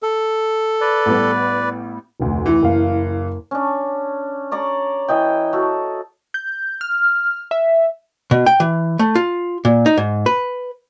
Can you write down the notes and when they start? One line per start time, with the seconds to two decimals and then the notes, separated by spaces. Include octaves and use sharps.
0.03 A4
0.81 B4 D5
1.06 A1 G3 B3
2.20 F1 D2
2.46 E3
2.63 F#1 F5
3.51 C#4 D4
4.51 C#5 D5 A#5
5.08 E3 D#5 G5
5.53 F#4 A4
6.34 G6
6.81 F6
7.51 E5
8.31 B2
8.46 G5
8.60 E3
8.99 A3
9.15 F4
9.65 A#2
9.86 D#4
9.98 G#2
10.26 B4